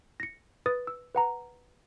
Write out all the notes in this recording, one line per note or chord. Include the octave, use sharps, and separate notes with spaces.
A#6 C#7
B4 D#6 A6
E6
B4 F#5 A#5